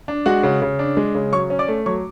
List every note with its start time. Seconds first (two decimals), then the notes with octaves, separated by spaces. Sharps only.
0.08 D4
0.26 G#3 F#4 F#5
0.43 C#3
0.62 C#3
0.79 D4
0.97 G#3
1.15 C#3
1.32 F#3 C#5 C#6
1.50 C#4
1.59 D5 D6
1.68 A3
1.86 F#3 C#5 C#6